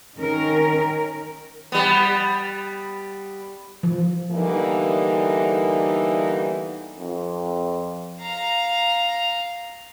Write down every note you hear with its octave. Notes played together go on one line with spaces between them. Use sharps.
D#3 C#4 A#4
G3 B3
F3
D3 E3 G3 A#3 B3 D#4
F2
F5 A#5